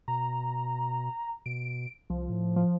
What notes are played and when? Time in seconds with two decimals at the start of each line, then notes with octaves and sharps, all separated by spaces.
0.08 B2 A#5
1.46 B2 D7
2.10 C2 F3
2.30 A2
2.56 F3